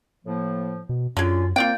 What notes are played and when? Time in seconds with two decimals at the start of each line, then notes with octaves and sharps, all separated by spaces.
0.25 A2 F3 A#3
0.89 B2
1.17 F#2 D3 C#4 F4 G#4
1.56 A#3 C4 F4 D5 G5